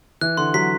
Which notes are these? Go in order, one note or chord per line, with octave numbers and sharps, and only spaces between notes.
E3 F#6
D3 C6
F#3 B6